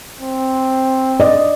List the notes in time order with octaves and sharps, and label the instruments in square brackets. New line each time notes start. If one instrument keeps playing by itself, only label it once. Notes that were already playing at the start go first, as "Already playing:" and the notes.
[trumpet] C4
[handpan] D5 D#5